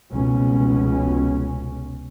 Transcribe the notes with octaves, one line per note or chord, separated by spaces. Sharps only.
F1 C#2 B2 C#4